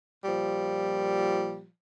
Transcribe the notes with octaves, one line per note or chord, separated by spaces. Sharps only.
A#2 F3 G3